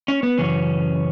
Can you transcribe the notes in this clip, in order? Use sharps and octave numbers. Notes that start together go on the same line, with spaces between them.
C#4
B3
F#2 C#3 E3 C#4